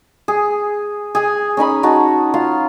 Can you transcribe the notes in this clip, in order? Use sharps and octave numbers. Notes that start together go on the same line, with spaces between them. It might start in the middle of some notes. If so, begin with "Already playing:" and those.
G#4
G#4 G#5
C#4 D#4 G#5 B5
D#4 F#4 A5
F4 F5